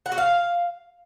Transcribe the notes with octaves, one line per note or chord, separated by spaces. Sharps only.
F#5
F#4
F5